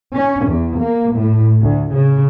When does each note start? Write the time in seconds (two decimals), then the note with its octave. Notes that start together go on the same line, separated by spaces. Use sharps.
0.14 C#4
0.48 E2
0.80 A#3
1.14 A2
1.62 D2
1.95 C#3